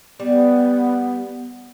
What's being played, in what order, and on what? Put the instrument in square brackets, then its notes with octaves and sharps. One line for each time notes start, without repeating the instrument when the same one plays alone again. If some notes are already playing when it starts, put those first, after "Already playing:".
[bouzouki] G3 [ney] B3